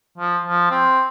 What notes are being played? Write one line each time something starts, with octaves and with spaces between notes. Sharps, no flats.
F3
F3
C4